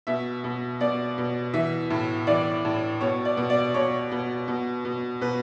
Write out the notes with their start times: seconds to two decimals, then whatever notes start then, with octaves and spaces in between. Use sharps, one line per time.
0.07 B2 E5
0.44 B2
0.81 B2 D5
1.18 B2
1.54 E3 E5
1.90 A2
2.27 E3 D5
2.65 A2
3.01 B2 C#5
3.25 D5
3.37 B2
3.50 D5
3.74 B2 C#5
4.11 B2
4.48 B2
4.85 B2
5.21 B2 B4